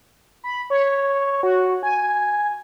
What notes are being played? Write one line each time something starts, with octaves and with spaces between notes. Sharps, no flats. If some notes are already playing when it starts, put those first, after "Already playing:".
B5
C#5
F#4
G#5